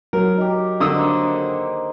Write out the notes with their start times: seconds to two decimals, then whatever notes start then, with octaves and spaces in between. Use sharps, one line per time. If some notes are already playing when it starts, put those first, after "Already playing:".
0.13 F#3 A#4
0.38 D#4 G4
0.80 D3 D#3 D#6 E6
0.95 A#3 C5